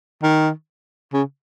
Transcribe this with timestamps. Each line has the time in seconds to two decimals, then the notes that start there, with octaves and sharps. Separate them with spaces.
0.22 D#3
1.13 C#3